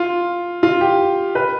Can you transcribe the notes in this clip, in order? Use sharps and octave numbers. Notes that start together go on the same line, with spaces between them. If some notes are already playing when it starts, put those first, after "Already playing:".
Already playing: F4
F4
G4
B4